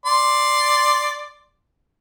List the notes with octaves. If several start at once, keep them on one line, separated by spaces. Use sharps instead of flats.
D5 C6